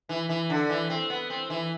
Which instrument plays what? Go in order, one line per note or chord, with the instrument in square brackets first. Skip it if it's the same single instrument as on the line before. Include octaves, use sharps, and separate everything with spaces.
[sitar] E3
E3
D3
E3
C4
B3
C4
E3